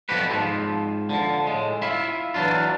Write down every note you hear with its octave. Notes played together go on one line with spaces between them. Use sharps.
B1 F2 F3 F#4 G4 B4
G#2 F3 C4
D3 F3
A2 G#3
E4 F4 E5
E3 F#3 A3 D4 F4